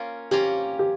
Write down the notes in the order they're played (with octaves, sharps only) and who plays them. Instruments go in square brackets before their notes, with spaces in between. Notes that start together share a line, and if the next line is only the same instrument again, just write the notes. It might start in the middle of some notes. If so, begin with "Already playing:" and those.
Already playing: [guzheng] A#3 C#4 F4 A#4
[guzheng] A#3 C#4 F4 A#4 [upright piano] G4
[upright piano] G4